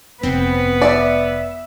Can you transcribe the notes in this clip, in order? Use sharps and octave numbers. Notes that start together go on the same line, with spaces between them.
F1 B3 C4 B4
D5 E5